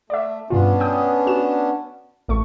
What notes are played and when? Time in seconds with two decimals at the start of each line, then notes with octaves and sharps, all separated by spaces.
0.10 A3 D5 E5
0.50 G2 B2 B3 C#4 D4 F4
0.80 G5 D#6
1.27 F#4 E7
2.28 A1 A3 C#6